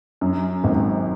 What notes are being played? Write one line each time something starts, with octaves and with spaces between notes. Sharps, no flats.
F#2
G#1